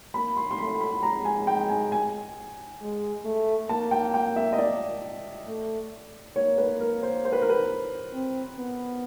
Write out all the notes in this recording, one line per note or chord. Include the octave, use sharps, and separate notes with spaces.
A#3 B5
C6
C6
A3 B5
B5
G#3 A#5
G#5
G5
G#5
G#5
G#3
A3
A#3 A5
G5
G5
E5
D#5
D5
A3
A#3 C#5
B4
A#4
C5
C5
B4
A#4
B4
C4
B3